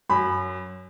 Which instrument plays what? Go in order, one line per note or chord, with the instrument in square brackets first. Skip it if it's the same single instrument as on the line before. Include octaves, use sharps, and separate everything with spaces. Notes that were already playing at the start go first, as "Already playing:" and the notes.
[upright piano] F#2 B5